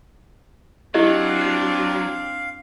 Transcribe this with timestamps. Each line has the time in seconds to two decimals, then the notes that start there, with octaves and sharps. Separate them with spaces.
0.95 F#3 C4 D4 E4 G4 D#5 F5